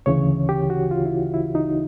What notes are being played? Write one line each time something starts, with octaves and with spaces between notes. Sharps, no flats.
D2 C#3 E3 C#5
G4
F#4
F4
E4
E4
D#4